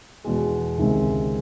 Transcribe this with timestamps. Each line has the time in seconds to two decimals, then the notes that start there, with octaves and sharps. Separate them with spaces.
0.24 E2 B2 G#3
0.78 C#2 C3 D#3 G#3 C4